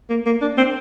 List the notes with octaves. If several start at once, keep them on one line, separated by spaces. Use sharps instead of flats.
A#3
A#3
D4
C4